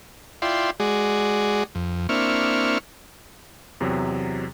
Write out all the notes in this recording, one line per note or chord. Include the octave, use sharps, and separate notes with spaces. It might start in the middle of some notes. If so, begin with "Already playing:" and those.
E4 F4 D5 G5 C6
G#3 F#4 G#4 D5
F2
A#3 C4 D4 E4 C#6 F6
E2 C3 F#3